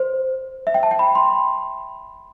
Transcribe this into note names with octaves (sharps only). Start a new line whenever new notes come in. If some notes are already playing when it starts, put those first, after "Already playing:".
Already playing: C5
E5
G5
A5
G5
B5
C6